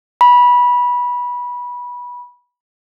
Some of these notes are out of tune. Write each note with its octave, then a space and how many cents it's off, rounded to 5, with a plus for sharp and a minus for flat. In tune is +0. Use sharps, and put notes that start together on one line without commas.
B5 -20